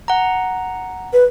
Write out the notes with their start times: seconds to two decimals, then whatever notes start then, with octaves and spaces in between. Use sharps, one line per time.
0.08 F#5 A#5
1.13 B4